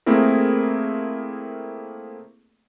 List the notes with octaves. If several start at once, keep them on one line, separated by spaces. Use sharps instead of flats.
A3 A#3 C4 E4 G#4 A#4